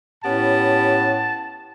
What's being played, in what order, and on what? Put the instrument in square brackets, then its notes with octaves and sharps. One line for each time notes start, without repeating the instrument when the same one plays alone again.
[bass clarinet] A2 [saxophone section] B3 C#4 G4 [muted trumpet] A5